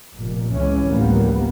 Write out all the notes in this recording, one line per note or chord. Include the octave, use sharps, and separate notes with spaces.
F1 A#2
C#2 E3 C#4
A1 D2 F3 G3 A#3 B3